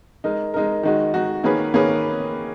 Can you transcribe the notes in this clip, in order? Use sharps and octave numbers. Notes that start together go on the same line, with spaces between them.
G#3 D#4 A#4
G#3 D#4 A#4
D#3 G#3 D#4 F#4
D#3 G#3 D#4 F#4
D#3 A#3 C#4 G#4 B4
D#3 A#3 C#4 G#4 B4